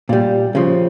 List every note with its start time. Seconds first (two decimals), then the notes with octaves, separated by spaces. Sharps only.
0.09 A#2 G3
0.55 C#3 F3